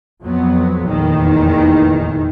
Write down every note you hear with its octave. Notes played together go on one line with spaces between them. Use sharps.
F2 F#3 B3
F1 A#1 E2 D#3 E3